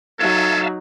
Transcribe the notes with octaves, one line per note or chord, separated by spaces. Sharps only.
F#3 D#4 A4 E5 F5 A5 G#6